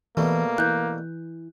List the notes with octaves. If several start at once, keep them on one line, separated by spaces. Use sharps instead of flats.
B2 E3 G3 A3 A#3
E3 F#6 G6